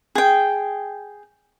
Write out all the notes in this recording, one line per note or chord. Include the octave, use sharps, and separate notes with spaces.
G#4 G5